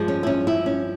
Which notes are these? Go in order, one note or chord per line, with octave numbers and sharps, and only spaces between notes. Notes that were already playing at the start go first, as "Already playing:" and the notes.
Already playing: G2 F3 G#3
C#4
E4
C#4
E4
C#4